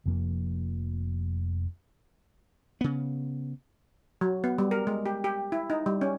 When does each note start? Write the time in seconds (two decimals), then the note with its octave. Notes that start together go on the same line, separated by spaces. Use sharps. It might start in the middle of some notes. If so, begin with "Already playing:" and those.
0.06 F1 F2 F3 A#3
2.81 C#3 B3
4.21 F#3
4.44 B3
4.58 G3
4.71 A#4
4.87 G#3
5.06 G4
5.24 G4
5.52 E4
5.70 D#4
5.86 G3
6.01 C#4